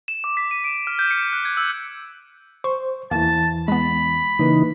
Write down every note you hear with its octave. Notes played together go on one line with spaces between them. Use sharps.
E7
D6
B6
D#7
D7
F6
G6
C#7
F#6
G#6
E6
C5 C#6
E2 E3 A#3 A5
G#3 B3 B5
C#3 E3 A#3 D#4 B4